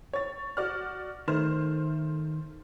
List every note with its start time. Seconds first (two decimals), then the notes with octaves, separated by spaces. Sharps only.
0.13 C#5 A6
0.57 F#4 D5 F6
1.28 D#3 A3 C5 F6